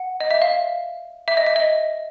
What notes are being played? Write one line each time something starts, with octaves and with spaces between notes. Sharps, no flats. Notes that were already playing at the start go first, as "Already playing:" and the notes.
Already playing: F#5
D#5
E5
F5
E5
D#5
E5
D#5